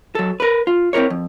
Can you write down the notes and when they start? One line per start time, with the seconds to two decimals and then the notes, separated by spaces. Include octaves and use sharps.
0.15 F#3 A4
0.40 A#4 B4
0.67 F4
0.93 C4 E4 F#4 A#4 C#5
1.10 F2